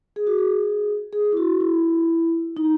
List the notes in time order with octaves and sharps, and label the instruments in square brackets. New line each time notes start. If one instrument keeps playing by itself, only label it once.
[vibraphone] G#4
F#4
G#4
G#4
E4
F#4
E4
D#4